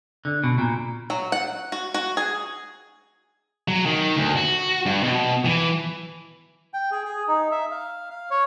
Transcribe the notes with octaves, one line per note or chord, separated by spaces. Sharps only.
D3
B2
A#2
F#3
F#5
F#4
F#4
G#4
F#3
D#3
D2
F#4
G2
B2
E3
G5
G#4
G#4
D#4
E5
F5
F5
C#5